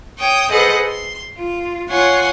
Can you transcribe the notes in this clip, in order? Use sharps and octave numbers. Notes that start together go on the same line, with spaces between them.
C#5 G5 D#6
G#4 A4 B4 C5 D#5 F#5
C6
F4
F4 C#5 F#5 G#5 C6